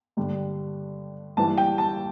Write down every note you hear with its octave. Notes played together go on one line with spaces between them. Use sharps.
G2 D3 G3
G2 E3 G3 A5
G5
A5